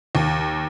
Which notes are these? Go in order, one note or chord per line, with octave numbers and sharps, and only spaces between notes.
D#2